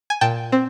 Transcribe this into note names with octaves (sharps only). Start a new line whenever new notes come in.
G#5
A#2 G5 A5
C4